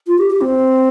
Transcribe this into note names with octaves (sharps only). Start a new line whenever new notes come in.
F4
G4
G4
C4